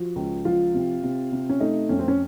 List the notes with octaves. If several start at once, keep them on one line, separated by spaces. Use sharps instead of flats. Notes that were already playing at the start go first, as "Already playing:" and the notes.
Already playing: F3 F#4
C#2
F3 F4
C3
C3
C3
C#4
A3 D#4
F2 C#4
C4
C#4